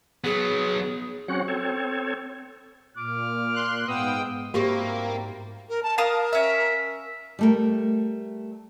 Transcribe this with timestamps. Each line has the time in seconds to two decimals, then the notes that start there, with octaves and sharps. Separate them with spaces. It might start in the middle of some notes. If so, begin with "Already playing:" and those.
0.24 F#3 B3 G#4
1.28 F#3 C4 C#4 F#4 F#5
1.48 C4 A4 C#5
2.97 A#2 D6 F6
3.54 C6 F#6
3.88 G#2 B3 F5 G5 D#6 E6
4.54 G#2 G3 A#3 C4 E4 F#4 G4 C#6
5.69 A#4
5.83 A5
5.98 A#4 F5 A5 D#6
6.33 C#4 E5
7.39 G3 A3 A#4